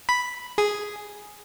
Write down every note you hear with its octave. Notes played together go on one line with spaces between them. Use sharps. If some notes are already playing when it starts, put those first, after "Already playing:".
B5
G#4